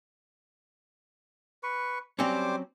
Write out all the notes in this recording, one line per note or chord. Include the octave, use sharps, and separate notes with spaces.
B4 C#6
F#3 G3 C4 C#4 C5 D6